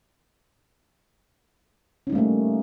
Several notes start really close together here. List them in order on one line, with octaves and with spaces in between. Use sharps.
C#4 D#4 G3 A#3 A3